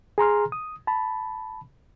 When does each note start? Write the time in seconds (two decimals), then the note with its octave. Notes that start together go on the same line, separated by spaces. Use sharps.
0.18 G#4 A#5 C6 F6
0.52 D#6
0.87 A5 B5